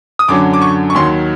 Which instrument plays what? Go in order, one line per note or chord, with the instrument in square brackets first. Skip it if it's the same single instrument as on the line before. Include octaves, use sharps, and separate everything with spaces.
[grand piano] D#6
F#2 D3 F#3 D6
D6
C#6
C#6
D#2 D#3 F#3 C6